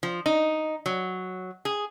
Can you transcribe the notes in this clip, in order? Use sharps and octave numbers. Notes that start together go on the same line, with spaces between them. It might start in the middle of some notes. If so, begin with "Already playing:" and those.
F3
D#4
F#3
G#4